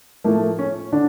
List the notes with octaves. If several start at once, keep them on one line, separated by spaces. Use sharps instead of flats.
A2 F3 A3 A#3
C#4
D3 D4